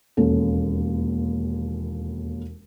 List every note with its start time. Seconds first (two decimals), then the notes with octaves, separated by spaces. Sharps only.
0.17 E1 D#2 C#4 A4